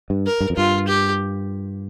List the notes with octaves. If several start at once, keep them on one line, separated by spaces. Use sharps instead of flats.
G2
A#4
G2
F2
G2 F4
G4